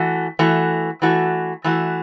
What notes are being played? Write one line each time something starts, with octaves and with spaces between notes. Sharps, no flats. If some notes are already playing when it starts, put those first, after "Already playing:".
Already playing: E3 A3 F#4
E3 A3 F#4
E3 A3 F#4
E3 A3 F#4